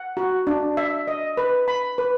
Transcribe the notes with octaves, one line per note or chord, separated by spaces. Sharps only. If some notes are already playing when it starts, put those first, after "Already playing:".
Already playing: F#5
F#4
D4
E5
D#5
B4
B5
B4